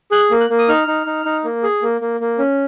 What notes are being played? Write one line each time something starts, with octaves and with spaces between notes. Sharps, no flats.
G#4 F#6
A#3
F#6
A#3
D#6
D#4 F6
D#4
D#4
D#4
A#3
G#4
A#3
A#3
A#3
C#4